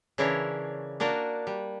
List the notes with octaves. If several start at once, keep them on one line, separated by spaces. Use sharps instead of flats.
C#3 E3 D4 E4 A#4 C#5
A#3 D4 F#4 A#4
G3